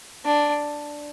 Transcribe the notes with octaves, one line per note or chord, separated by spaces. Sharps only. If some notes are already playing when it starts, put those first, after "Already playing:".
D4